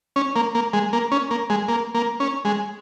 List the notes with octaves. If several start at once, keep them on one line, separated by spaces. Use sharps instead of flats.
C#4
A#3
A#3
G#3
A#3
C#4
A#3
G#3
A#3
A#3
C#4
G#3